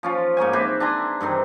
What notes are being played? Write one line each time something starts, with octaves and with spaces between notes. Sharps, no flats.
F3 C#4 F4
G#2 A#3 C#5 G#5
C4 G4 B4 E5
D4 G#5 A#5 C6
G2 C3 D#3 E3